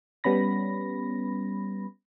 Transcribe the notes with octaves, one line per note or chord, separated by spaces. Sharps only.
G3 B3 C#4 B5 A#6